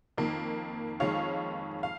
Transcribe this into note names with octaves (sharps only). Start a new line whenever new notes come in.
F2 D#3 A#3
F2 D#3 G#3 C#5 F5
F5